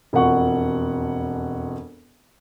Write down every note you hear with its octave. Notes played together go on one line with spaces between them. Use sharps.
E1 F2 F#5 C#6